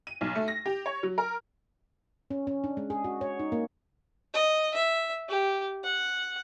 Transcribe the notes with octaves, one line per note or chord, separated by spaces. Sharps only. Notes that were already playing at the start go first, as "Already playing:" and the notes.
D#7
B1
A3
A#6
G4
C#5
F#3
A#4
C#4
C#4
D4
G#3
G#4
F#4
C#5
D#4
A#3
D#5
E5
G4
F#5